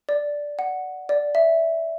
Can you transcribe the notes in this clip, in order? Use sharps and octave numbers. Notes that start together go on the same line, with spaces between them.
D5
F#5
D5
E5